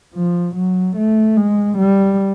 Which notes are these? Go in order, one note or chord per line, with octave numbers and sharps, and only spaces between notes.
F3
F#3
A3
G#3
G3